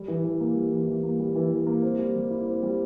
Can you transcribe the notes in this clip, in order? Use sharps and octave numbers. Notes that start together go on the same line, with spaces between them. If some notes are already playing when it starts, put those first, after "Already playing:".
Already playing: G3
E3
E3
A#3
G3
E3
E3
A#3
G3
E3
E3
A#3
C4
G3
G3
E4
C4
G3